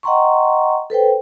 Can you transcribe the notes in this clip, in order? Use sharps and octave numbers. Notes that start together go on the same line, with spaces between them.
D#5 F#5 G5 A#5 C6 C#6
A4 B4 C5 G5